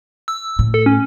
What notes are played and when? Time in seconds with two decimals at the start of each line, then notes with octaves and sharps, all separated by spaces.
0.28 E6
0.59 A2
0.74 A4
0.86 C#4